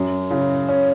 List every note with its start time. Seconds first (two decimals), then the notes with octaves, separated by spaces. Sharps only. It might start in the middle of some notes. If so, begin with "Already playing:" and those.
Already playing: F#2
0.31 C#3
0.68 C#4